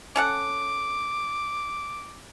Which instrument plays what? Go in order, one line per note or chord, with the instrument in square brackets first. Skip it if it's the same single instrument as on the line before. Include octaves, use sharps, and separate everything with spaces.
[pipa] C#4 A4 F#5 [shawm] D6